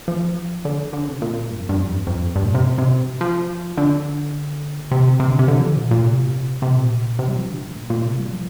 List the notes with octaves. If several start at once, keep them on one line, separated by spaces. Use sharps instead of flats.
F3
D3
D3
C3
A#2
G2
F2
G2
F2
G2
F2
G2
A#2
C3
C3
F3
D3
C3
C3
D3
C3
D3
F3
D3
A#2
A#2
C3
C3
A#2
C3
G3
F3
D3
G2
A#2
A#2
C3
G3
F3